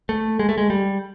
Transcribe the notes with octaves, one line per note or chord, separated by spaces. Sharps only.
A3
G#3
A3
G#3
G3